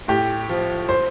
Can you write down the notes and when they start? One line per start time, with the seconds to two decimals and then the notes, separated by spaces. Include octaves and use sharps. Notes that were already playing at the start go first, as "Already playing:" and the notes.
0.08 A2 G4
0.49 F3
0.89 C5